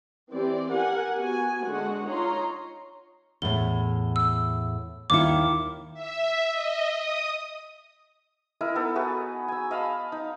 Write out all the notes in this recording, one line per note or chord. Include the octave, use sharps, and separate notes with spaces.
E3 C4 G4 D5
G4 A#4 F#5 G#5
B3 F#4 G#5
D3 G#3 D4 F#4 F#5
D#4 F4 C#5 A#5 C6
E2 A2 G7
E6
D#2 D#3 E4 D6 C#7
E5
D#5
D#6
E4 A#4 D#5
B3 D#4 A4
F#4 G#4 B4
G#5 E6
D#5 F5 A5 B5
D#4